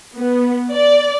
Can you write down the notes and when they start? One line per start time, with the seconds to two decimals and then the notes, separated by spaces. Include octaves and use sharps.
0.17 B3
0.72 D5